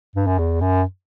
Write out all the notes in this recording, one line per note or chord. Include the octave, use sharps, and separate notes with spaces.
G2
F#2
E2
F#2